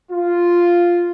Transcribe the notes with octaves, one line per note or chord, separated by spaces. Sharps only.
F4